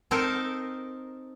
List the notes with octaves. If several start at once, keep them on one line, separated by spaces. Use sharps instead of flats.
C4 D#4 A4 A#4 D#5 A5